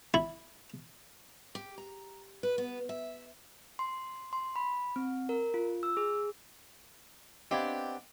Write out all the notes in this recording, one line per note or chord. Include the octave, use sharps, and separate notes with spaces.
E4
G4
A#5
B4
B3
E5
C6
C6
B5
C4
A#4
F4
E6
G#4
B3 C4 D4 G4 D#5 F5 G#6